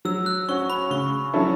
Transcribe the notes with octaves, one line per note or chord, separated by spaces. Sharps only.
F#3 E6
F#6
C#4 F#4 C#6
B5
C#3 C#6
F#3 C#4 E4 A4